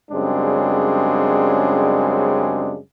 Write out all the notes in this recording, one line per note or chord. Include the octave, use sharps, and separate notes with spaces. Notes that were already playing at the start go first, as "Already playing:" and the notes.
F#2 C#3 G3 G#3 C4 D4